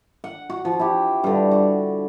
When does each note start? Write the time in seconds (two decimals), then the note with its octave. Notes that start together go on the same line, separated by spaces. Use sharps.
0.24 F#5
0.50 F#4
0.65 F3
0.79 E4 G4
1.24 G2 D3
1.51 F#4